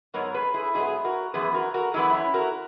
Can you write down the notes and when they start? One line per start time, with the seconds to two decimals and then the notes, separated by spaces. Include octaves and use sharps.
0.14 G#2 F#3 B3 A#4 C#5
0.34 G#4 B4
0.54 E4 G#4
0.74 G#2 F#3 B3 E4 G#4
1.05 F#4 A#4
1.34 F#2 E3 B3 G#4 B4
1.54 F#4 A#4
1.74 F#4 A#4
1.94 F#2 E3 B3 E4 G#4
2.14 C#4 E4
2.34 F#4 A#4